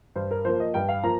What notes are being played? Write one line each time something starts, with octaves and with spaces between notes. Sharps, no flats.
G2 C5
A#4
F3 A#3 C5
D#5
G2 G5
F5
F3 A#3 A#5